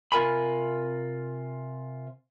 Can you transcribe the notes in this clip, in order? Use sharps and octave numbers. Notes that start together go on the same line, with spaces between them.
C3 F4 A#4 G#5 B5